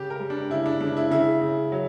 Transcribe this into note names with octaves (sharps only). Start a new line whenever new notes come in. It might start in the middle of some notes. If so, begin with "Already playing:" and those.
Already playing: C#3 G4
A#4
G3
D4
C#3 E4
D4
C#3 D4
E4
C#3 E4
C#3
F#3